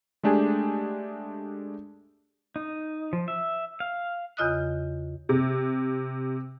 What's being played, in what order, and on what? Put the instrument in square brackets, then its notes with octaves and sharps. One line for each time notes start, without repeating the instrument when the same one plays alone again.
[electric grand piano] G#3 A3 D4 G4 G#4 G#5
[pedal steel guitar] D#4
F3
E5
F5
[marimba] E2 C#3 F4 D#5 D#6 F#6
[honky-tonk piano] C3